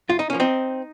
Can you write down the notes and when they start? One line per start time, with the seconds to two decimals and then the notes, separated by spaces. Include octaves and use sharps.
0.09 F#2 F4
0.19 D#4
0.30 F3 A#3 C#4
0.40 C4 D#4